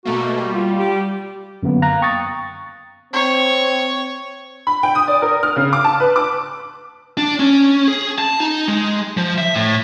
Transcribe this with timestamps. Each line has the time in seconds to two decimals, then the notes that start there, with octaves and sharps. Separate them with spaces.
0.05 B2 A3 A#3 F#4
0.37 G3
0.54 F4
0.78 G4
1.63 F#2 D3 A#3 B3
1.82 F5 A#5 F#6
2.02 G5 C#6 D#6 A6
3.13 C4 C#5
4.67 B5
4.83 G5
4.95 D#6
5.07 D5
5.22 A#4
5.43 F6
5.56 C#3
5.73 D6
5.84 A5
6.00 B4
6.16 D6
7.17 D4
7.40 C#4
7.88 G#4
8.18 A5
8.40 D#4
8.68 G#3
9.17 F3
9.38 E5
9.56 A2